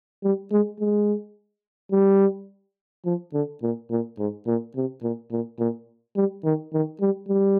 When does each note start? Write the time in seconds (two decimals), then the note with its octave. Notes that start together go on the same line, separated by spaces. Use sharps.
0.24 G3
0.52 G#3
0.80 G#3
1.92 G3
3.06 F3
3.34 D3
3.63 A#2
3.91 A#2
4.19 G#2
4.47 A#2
4.76 C3
5.03 A#2
5.32 A#2
5.59 A#2
6.16 G3
6.44 D#3
6.73 D#3
7.01 G3
7.29 G3